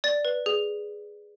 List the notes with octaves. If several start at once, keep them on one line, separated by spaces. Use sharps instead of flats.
D5 A6
B4
G#4